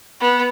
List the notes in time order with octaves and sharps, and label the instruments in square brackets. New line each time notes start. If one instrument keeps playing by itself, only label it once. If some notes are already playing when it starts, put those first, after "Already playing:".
[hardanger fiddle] B3